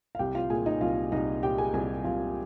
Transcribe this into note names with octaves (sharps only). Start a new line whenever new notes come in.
F5
C2 G4 G5
F4 F5
A#2 G#4 G#5
D#4 D#5
C2 F4 F5
C2 D#4 D#5
A#2 G4 G5
G#4 G#5
C2 G#4 G#5
C2 F4 F5